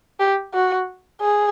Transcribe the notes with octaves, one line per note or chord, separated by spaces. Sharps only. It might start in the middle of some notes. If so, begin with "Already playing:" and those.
G4
F#4
G#4